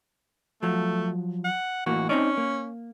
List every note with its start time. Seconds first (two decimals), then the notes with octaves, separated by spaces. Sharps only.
0.63 F3 F#3 A3
1.45 F#5
1.86 A2 E3 A#3 F#4
2.09 C4 C#4 D#4 D5
2.37 A#3